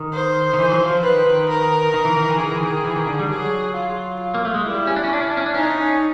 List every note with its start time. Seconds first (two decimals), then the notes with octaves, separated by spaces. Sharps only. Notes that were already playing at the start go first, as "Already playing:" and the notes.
Already playing: D#3
0.13 C5
0.53 D#3
0.59 E3
0.72 F#3
0.80 F3
1.03 D#3 B4
1.26 D#3
1.49 A#4
1.94 D#3
2.05 E3
2.16 D#3
2.29 E3
2.39 D#3 G#4
2.52 E3
2.63 D#3
2.85 E3
2.96 D#3
3.07 D3
3.19 G3
3.29 F#3 G#4
3.75 F4
4.20 F4
4.34 A#3
4.45 A3
4.54 G#3
4.65 G3 E4
4.87 C#4
4.96 D4
5.04 C#4
5.13 D4
5.21 C#4
5.30 D4
5.37 C#4
5.46 D4
5.54 C#4 D#4
5.63 D4
5.71 C#4